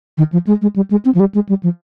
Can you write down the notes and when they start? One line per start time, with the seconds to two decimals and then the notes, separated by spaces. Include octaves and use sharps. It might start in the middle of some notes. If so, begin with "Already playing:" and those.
0.18 D#3
0.32 F3
0.47 G#3
0.62 G#3
0.76 G3
0.91 G#3
1.05 C4
1.15 F3
1.20 G3
1.35 G#3
1.49 G3
1.63 F3